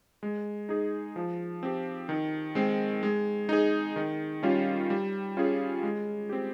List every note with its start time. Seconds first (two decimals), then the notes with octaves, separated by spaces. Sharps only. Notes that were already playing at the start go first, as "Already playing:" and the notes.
0.23 G#3
0.69 D#4 G#4
1.16 F3
1.63 C4 G4
2.09 D#3
2.55 G#3 C4
3.03 G#3
3.49 D#4 G#4
3.96 D#3
4.43 G3 C#4 F4
4.90 G3
5.37 C#4 F4 G#4
5.83 G#3
6.29 C4 G4